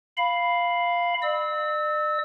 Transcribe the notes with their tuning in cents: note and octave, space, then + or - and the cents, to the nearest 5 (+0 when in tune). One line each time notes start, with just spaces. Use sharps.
F5 +0 B5 +0
D5 +45 E6 -25